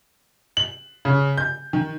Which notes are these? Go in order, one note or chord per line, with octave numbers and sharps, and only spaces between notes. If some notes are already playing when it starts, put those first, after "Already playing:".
F#7
C#3
G6
D#3